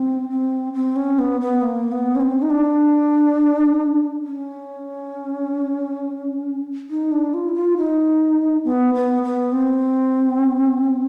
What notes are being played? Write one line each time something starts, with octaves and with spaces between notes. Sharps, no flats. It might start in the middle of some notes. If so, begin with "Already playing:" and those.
Already playing: C4
C4
C4
C#4
B3
B3
A#3
B3
C#4
C4
D#4
D4
C#4
D#4
D4
F4
E4
F4
D#4
B3
B3
B3
C4